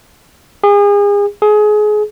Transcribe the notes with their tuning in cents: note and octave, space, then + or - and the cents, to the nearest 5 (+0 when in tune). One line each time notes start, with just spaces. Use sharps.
G#4 -35
G#4 +25